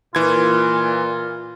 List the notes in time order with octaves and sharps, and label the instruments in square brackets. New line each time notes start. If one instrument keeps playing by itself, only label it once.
[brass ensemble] A#2 [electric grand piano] E3 G#6 [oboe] F4